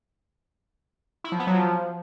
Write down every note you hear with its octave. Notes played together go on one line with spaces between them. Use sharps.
E4
F3
B3
F#3
F3